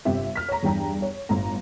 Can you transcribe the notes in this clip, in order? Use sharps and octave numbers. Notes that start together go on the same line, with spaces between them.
G1 C3 C4 G4 E5
F6 B6
C#5 A#5
E2 G2 G5 A#5
C#5
G1 A2 A#5